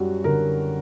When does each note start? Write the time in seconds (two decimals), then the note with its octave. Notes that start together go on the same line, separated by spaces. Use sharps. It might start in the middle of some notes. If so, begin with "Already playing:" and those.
Already playing: F#2 G3 F#4
0.24 D3 A#4